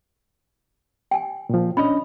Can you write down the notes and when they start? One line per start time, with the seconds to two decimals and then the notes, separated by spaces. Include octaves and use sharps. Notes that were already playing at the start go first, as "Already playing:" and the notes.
1.11 G5 G#5
1.49 A#2 F3
1.77 C#4 D4 D#5 B5